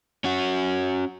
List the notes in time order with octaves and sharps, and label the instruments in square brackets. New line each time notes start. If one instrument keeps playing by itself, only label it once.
[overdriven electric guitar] C#4 F#4